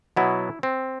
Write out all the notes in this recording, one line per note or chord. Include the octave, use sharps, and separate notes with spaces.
B2 F#3 B3 E4
C4